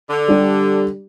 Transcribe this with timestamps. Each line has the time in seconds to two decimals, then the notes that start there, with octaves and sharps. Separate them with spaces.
0.10 D3
0.28 G3 D4 G4